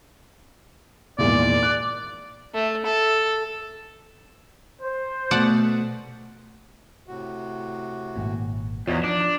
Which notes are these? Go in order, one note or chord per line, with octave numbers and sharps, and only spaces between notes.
G#1 E2 A#2 D5
F#6
A3
A4
C5
B2 A3 D5 F#5 A5
A2 C3 F#4
G#1 A#2
E2 F3 F#4 C#5 D#5
D4 D#4